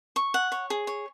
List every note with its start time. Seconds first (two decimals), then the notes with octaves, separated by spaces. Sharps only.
0.16 C#6
0.34 F#5
0.52 C#5
0.70 G#4
0.87 C#5